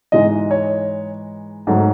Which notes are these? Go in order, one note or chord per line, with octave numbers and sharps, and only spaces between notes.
G#2 E3 G#3 D#4 D#5
C#5
G#2 F#3 A3